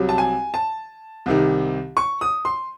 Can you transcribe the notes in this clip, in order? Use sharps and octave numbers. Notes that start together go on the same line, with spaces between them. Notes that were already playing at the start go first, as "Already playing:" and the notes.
Already playing: C2 C3 F#3
A5
G#5
A5
C2 C3 D#3
C#6
D#6
C6